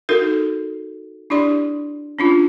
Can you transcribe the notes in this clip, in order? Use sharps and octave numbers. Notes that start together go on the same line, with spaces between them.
D#4 F#4 A4 A#4
D4 E4 G4 D5 C6
C#4 D4 F4